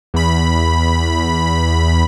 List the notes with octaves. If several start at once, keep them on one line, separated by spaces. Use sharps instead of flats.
E2 B5